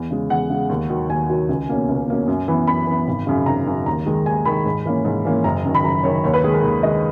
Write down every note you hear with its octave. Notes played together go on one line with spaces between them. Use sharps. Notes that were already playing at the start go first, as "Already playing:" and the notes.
Already playing: E2
C#3 G#3
E2 F#5
C#3 G#3
D#2
D#3 F#3
D#2 G#5
D#3 F#3
C#2
B2 A#3 C#4
C#2
B2 A#3 C#4
F#2
E3 B3
F#2 B5
E3 B3
G#1
F#2 C#3
G#1 A#5
F#2 C#3
D#2 A#5
D#3 G#3
D#2 G#5
D#3 G#3 B5
G#2
E3 A#3 C#4
G#2
E3 A#3 C#4
F#1 A#5
F#2 D#3
B5
F#1 A#5
F#2 D#3 C#5
D#2 C#5
B4
D#3 G#3 G#4
A#4
D#2
D#3 G#3 D#5